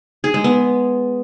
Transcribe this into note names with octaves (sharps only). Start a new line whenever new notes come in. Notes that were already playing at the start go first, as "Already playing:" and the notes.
G#4
G#3
B3